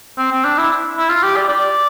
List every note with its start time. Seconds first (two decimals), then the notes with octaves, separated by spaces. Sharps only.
0.18 C4
0.32 C4
0.44 D4
0.58 E4
0.98 E4
1.09 F4
1.23 G4
1.36 D5
1.49 D5